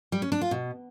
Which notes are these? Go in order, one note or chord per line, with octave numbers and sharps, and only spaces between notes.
G3
C#4
D4
F4
B2